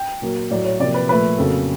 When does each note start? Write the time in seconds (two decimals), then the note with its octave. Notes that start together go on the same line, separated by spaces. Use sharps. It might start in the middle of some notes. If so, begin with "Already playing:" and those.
Already playing: G5
0.22 A#2 F#3 A#3
0.51 A2 F#3 A3 D5
0.65 C#5
0.80 C3 F3 A#3 D5
0.94 B4
1.09 A#2 F3 A3 B4
1.38 F2 C#3 F#3 A#3 A4